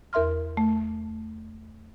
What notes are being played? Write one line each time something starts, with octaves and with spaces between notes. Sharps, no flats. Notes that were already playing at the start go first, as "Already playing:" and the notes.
E2 A#4 E5 C6 F6
A3